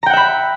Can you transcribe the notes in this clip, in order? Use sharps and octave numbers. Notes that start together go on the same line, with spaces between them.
E5 F#5 G5 A#5 B5